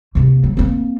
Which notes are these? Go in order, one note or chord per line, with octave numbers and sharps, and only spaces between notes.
C3 A#3
F#3
A#3 C4